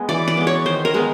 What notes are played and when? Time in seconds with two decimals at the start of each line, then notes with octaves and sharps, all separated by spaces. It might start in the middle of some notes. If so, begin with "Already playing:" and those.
Already playing: G#3 B3
0.09 E3 D5
0.28 D5
0.37 G#3 B3
0.47 C#5
0.66 D#3 C5
0.85 A#4
0.94 G#3 B3